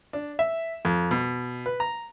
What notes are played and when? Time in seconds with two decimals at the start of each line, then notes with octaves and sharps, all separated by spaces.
0.13 D4
0.39 E5
0.85 F2
1.11 B2
1.66 B4
1.80 A#5